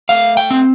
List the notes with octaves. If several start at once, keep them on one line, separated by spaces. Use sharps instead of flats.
A3 F5
G5
C4